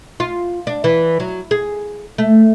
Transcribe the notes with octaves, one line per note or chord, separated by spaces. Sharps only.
F4
D4
E3
F#3
G#4
A3